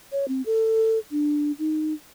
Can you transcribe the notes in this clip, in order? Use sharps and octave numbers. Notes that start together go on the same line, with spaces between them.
C#5
C4
A4
D4
D#4